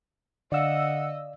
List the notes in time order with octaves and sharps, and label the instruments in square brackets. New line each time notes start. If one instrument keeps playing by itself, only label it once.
[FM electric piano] D3 E6 [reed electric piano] D5 F5 [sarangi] D#5 [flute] F#5